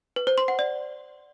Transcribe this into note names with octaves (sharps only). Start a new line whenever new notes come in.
B4
C5
C6
F#5
D5